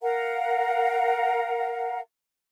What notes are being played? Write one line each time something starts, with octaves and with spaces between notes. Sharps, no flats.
A#4 F5 F#5 A#5